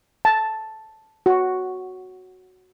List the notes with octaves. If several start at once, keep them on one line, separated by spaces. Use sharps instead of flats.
A5
F#4